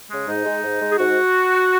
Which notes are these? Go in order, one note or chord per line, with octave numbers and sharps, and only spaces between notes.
C#3 G#3
G#2 D#4
G#3
G#2
G#3
G#4
G#2 F#4